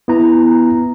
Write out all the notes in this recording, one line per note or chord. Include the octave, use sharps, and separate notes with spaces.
B3 E4 A#5